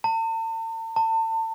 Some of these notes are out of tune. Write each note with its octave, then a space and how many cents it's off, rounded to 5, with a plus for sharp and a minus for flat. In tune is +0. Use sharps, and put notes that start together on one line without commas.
A5 +45
A5 +35